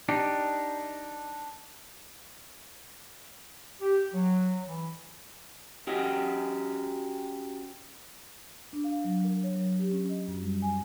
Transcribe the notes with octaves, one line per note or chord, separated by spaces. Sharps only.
D4 D#4 G4
G4
F#3
E3
C#4 F#4 G4 D#5
D4
F5
F#3
A#4
C#5
F#3
G4
C#4
D#5
F#2
G3
G#5